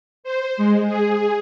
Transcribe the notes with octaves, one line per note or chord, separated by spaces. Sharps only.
C5
G#3
G#4